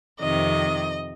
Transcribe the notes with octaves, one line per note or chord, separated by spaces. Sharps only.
F2 C3 D#3 D#5